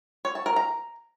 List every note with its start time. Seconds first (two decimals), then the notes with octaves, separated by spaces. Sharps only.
0.25 C#5
0.35 A5
0.46 A#4
0.56 A#5